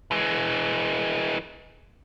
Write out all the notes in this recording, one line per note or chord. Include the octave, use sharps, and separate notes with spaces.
E3 G#3